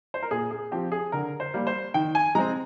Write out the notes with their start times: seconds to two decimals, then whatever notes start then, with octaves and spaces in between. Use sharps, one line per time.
0.14 C5
0.22 A#4
0.31 A#2 G#4
0.51 G#4
0.71 F3 C4 G4
0.92 G#4
1.12 D3 A#4
1.40 C5
1.54 G3 A#3
1.67 C5
1.94 D#3 G5
2.15 G#5
2.35 G#3 C4 A#5